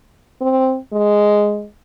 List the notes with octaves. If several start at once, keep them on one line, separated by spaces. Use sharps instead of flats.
C4
G#3